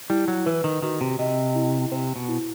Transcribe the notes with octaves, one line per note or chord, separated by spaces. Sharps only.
G3 E4
F#3
E3 B4
D#3
D#3 F#4
C3
C3 D#5
E4
C3 C5
B2
E4